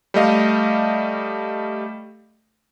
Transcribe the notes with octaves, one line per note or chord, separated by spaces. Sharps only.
G3 A3 D#5 F5